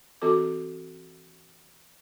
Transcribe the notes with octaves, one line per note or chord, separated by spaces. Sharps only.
E3 C4 F#4 A4 D6